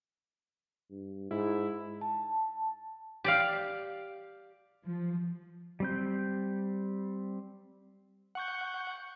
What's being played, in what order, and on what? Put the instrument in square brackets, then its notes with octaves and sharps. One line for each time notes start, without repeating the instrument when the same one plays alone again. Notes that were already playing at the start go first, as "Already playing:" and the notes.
[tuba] G2
[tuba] G#2 [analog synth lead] E4
[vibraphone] A5
[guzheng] G4 D5 F5
[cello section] F3
[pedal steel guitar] G3 C4 G6
[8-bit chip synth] F#5 C#6 G6